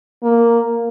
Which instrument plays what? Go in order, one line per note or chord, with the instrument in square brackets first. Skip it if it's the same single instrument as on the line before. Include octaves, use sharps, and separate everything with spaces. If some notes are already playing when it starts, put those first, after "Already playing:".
[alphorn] A#3